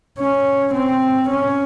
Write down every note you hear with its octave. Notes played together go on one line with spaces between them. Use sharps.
C#4
C4
C#4